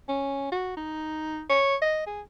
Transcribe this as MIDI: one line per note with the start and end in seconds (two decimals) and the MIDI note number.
0.09 0.47 61
0.52 0.75 66
0.77 1.42 63
1.50 1.76 73
1.82 2.03 75
2.07 2.21 68